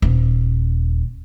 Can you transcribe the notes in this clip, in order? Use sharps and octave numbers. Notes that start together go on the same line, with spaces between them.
D#1